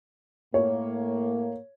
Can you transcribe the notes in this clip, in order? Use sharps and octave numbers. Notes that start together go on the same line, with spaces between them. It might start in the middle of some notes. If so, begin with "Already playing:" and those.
A2 A#3 C#5